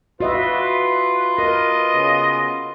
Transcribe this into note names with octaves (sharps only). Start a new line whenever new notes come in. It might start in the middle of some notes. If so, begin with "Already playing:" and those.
F4 F#4 B4 D#5 E5
A#4 D#5
C#3 B3